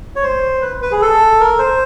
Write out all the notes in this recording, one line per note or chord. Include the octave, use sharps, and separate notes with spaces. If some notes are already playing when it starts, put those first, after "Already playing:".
C#5
C5
B4
B4
G#4
A4
A#4
C5